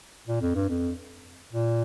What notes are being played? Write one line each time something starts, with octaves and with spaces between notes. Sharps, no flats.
A#2
F2
G2
F2
A#2